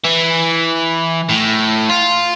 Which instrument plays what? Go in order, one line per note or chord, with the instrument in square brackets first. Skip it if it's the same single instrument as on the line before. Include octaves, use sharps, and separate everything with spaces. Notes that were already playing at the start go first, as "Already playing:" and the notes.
[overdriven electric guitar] E3
A2
F4